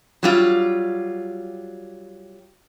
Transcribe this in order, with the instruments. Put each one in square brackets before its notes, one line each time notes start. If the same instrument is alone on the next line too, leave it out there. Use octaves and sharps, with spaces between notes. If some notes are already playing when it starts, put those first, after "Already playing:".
[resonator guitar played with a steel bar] F#3 G3 F4